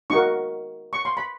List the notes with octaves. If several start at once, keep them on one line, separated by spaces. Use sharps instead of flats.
D#4 F#4 A#4 C#6
C#6
C6
B5